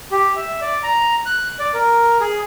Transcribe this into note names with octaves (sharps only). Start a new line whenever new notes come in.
G4
E5
D5
A#5
F#6
D5
A#4
G#4